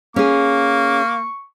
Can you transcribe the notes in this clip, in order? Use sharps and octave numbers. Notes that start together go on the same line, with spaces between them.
A#3 C#4 G#4 C#6